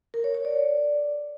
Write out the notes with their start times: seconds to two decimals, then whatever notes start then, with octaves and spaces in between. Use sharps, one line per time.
0.14 A#4
0.24 C#5
0.34 C#5
0.45 D5